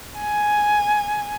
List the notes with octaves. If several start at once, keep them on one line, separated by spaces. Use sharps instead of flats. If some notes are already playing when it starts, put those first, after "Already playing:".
G#5